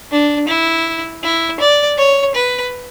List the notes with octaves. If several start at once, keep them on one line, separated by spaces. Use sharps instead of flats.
D4
E4
E4
D5
C#5
B4